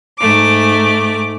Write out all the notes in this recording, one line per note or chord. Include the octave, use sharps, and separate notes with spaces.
G#2 A3 D6